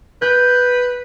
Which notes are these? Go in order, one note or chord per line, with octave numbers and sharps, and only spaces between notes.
B4 G6